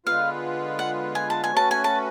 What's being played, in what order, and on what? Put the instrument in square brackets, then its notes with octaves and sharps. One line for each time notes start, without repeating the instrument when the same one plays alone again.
[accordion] D3 G#3 B3 F4 B4 [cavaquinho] F5
[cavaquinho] F#5
G#5
A5
G#5
[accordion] A3 C#4 F#4 B4 [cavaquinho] A5
[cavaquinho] G#5
A5